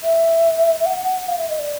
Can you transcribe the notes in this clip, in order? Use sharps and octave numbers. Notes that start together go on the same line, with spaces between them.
E5
F#5
F5
E5
D#5
D5